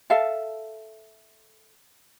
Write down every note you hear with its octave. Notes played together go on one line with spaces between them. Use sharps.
A4 E5 F5 A5